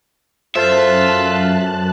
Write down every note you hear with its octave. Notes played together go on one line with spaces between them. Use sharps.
F#2 F4 A4 C5 E5 A5 F#6